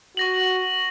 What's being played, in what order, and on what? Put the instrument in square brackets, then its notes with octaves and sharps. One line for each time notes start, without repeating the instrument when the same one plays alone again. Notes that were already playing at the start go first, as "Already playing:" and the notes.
[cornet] F#4 [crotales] C#6 A#6 F#7